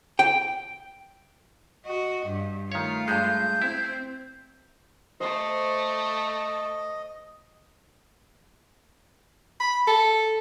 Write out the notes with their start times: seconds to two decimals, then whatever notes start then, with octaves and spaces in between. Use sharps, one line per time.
0.19 G5
1.85 F#4 D#5
2.27 G2
2.72 D#3 A3 F4 C#5
3.08 G2 G#3 G6
3.62 C4 E4
5.20 A3 C5 D#5 C6
9.60 B5
9.87 A4